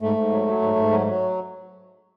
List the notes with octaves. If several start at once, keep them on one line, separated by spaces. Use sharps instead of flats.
G#2 A3
G#2
F#3
F#3
G#2
G#2
F#3
F#3